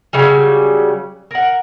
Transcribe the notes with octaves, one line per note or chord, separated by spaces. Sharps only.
C#3 F#3 G3
A#4 F#5